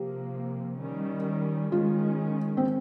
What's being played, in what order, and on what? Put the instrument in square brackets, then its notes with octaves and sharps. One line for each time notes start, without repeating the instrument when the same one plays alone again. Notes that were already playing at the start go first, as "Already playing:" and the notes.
Already playing: [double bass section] C3 F3 A#3 [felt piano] G4
[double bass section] D#3 G3 C#4
[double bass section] D#3 G#3 C#4 [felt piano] F4
[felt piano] C4